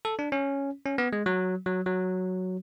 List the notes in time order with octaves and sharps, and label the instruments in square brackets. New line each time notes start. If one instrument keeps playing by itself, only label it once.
[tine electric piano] A4
D4
C#4
C#4
B3
G#3
F#3
F#3
F#3